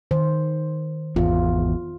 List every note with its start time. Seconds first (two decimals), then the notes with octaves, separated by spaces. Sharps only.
0.11 D#3 C5
1.16 G#1 E2 F4